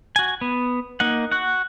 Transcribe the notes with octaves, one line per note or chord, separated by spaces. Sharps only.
F#4 G#5
B3
A#3 D#4 F#5
F#4 F#5